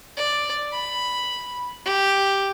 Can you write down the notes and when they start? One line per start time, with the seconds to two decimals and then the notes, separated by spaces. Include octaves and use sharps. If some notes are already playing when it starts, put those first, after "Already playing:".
0.17 D5
0.72 B5
1.85 G4